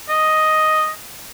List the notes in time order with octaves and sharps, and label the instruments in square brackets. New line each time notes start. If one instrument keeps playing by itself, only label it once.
[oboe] D#5